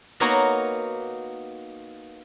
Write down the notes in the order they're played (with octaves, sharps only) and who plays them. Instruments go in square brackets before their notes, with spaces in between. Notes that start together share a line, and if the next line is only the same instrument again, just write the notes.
[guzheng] A#3 B3 D#4 F#4 C#5 F#5